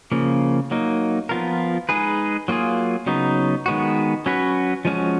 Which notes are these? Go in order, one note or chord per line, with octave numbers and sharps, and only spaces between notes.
C#3 F3 A#3
F#3 A#3 D#4
F3 B3 F4 A#4
G#3 D#4 G#4 B4
F#3 A#3 F4 G#4
C#3 F#3 B3 D#4
D#3 G#3 B3 F#4
F#3 C#4 F#4 B4
F3 G#3 C#4 F#4